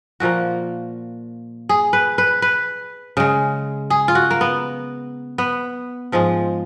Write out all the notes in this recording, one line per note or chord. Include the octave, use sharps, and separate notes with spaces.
A#2 F3 A#3 F#4
G#4
B4
B4
B4
C#3 G#3
G#4
F4
F#4
A#3
B3
B3
G#2 F3 G#3